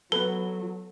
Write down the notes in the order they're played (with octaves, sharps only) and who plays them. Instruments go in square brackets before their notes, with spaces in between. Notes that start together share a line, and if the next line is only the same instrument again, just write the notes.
[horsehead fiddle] F#3 [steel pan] B3 B4 [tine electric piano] A4 [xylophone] G7